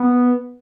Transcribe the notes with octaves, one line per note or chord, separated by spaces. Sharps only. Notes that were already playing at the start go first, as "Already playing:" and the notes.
Already playing: B3